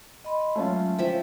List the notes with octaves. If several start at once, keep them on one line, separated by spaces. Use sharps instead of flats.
D#5 B5 C6
F#3 G#3 A3 C#4 F4
F3 E5 G5